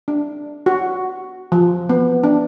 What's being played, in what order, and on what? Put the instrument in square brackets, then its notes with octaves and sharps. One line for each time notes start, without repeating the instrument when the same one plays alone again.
[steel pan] D4
F#4
F3
B3
D4